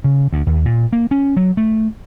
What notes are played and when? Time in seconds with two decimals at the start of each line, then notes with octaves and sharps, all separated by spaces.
0.04 C#3
0.33 D2
0.47 D#2
0.65 A#2
0.93 A#3
1.11 C#4
1.37 F#3
1.57 A3